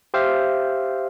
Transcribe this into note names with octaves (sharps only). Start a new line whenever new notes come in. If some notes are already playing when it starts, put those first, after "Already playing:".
G4 C5 E5 F5